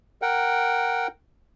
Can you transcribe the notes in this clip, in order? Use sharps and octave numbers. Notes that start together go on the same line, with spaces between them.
A#4 F#5 G5